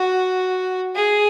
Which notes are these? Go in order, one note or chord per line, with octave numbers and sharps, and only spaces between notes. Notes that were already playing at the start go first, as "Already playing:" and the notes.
Already playing: F#4
G#4